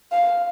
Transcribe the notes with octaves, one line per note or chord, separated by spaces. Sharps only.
F5